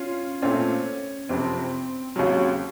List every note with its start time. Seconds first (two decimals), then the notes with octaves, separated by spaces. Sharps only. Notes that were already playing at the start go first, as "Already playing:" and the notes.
Already playing: C#4 F4
0.42 A#2 A3 C4 C#4 F4
1.29 F#1 F2 C3 C4
2.16 D#2 C#3 F#3